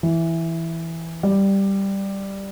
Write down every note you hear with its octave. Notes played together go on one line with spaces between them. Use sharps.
E3
G3